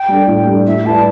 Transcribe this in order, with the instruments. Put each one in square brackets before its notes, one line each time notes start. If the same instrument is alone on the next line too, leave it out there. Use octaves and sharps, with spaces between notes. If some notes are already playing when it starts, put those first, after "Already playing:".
Already playing: [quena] G5
[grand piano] G3 D4 A4
A2
G3 D4 A4
[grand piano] A2 [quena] E5
[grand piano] G3 E4 B4 D5 [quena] A5